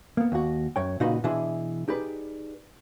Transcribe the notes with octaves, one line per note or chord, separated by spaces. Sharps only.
A#3 B3
D#2 F#4
F#2 C#5 G5
A#2 C#3 D#4 F#4 B4 C6
B2 E3 D4 E4 G#4 C6
D#4 G4 G#4 B4 D5